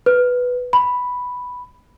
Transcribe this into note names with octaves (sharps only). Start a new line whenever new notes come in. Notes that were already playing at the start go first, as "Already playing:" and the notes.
B4
B5